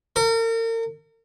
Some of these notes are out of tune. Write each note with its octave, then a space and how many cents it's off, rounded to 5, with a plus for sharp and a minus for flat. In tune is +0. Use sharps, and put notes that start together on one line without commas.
A#4 -40